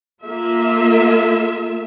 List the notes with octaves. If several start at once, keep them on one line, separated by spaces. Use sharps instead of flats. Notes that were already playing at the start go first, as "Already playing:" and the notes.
A#3 F4 A4 E5